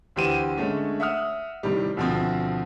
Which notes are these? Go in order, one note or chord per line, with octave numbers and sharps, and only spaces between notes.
D2 E3 G4 C5 D#7 E7
D3 G#3 A3 C#4
E5 F#5 D#6 F6
A2 C3 D#3 G3
D2 B2 F3 A3 C4